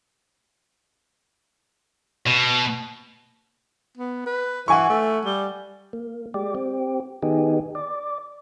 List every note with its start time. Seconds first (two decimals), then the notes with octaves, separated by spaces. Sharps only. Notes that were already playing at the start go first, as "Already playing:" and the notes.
2.27 B2
3.97 B3
4.26 B4
4.68 E3 F#5 G#5 C#6
4.90 A3
5.25 G3
5.93 A#3
6.34 G#3 G4 D5
6.55 C4 G4
7.23 D#3 B3 D#4 G4 G#4
7.75 D5